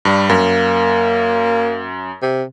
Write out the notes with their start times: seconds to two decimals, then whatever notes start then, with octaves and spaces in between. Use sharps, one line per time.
0.05 G2 G3
0.29 F#2 A#3
2.22 C3